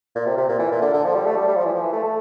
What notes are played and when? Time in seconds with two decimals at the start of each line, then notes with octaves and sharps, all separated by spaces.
0.15 A#2
0.26 C3
0.38 C3
0.49 A#2
0.59 E3
0.71 A#2
0.81 D3
0.94 D3
1.05 F3
1.15 G3
1.26 A3
1.37 G3
1.48 G3
1.57 F3
1.65 E3
1.73 F3
1.81 E3
1.93 A3
2.04 A3